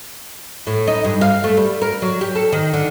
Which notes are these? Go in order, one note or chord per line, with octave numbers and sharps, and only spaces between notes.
A2
D#4
G2
F5
A3
G3
A#4
F#3
G4
A4
D#3
D3